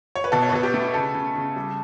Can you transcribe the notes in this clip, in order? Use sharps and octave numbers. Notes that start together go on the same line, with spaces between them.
C#5
B4
B2 A4
C#5
B4
B2 A4
G4
A3
C#3 A4
C#3
C#3
G3